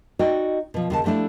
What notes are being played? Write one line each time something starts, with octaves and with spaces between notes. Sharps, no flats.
D#4 F#4 D5 D#5 G5
B2 F3
D#2 C#3 A5
F3 G3 A3 D4 E4